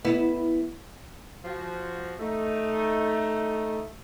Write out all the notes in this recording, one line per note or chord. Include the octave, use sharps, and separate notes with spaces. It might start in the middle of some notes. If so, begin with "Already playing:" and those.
B3 E4
F3 F#4
A3 D#4